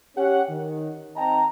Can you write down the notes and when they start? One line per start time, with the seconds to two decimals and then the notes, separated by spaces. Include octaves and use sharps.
0.17 C#4 G4 F#5
0.50 D#3
1.16 C4 D#4 D#5 G5 A5 A#5